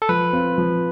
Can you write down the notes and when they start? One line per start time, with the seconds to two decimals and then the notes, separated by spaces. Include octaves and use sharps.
0.02 A4
0.09 F3 B4
0.33 C4 F4
0.58 F3